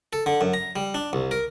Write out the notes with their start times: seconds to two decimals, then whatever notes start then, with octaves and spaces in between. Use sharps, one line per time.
0.13 A4
0.26 D3
0.41 F#2
0.54 A#5
0.76 G3
0.95 D4
1.13 C2
1.31 A#4